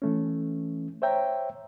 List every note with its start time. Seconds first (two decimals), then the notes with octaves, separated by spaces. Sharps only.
0.02 E3 A3 C#4
1.02 C5 C#5 E5 G5 A#5